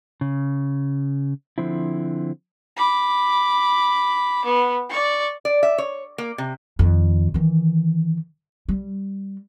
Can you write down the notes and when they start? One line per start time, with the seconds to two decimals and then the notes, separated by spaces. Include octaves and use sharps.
0.21 C#3
1.58 D3 F3 C4 E4
2.77 B5 D6
4.45 B3
4.90 D5 C#6
5.45 D5
5.63 E5
5.78 C#5
6.18 A#3
6.38 C3
6.79 F2 D#3
7.34 D#3 E3
8.69 G3